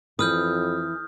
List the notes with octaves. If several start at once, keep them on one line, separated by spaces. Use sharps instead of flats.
F2 E3 B4 D#6 F6 G6